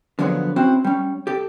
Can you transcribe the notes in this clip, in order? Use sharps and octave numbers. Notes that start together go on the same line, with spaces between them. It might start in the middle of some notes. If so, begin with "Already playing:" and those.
D3 F3 F#3 B3 G#4 C#5
C4 C#4 E4 F#4 C5
G3 C#4
G4 A4